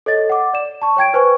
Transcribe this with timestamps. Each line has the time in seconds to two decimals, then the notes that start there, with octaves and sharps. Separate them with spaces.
0.06 A4 C#5 D#5 A6
0.29 F#5 D6
0.53 D5 E7
0.82 A5 C#6
0.97 C#5 G5 G#6 D7
1.14 B4 C5 G#5 C#6